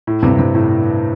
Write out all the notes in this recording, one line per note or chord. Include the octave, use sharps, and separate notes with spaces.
A2
G2 C3
G2 C3
A2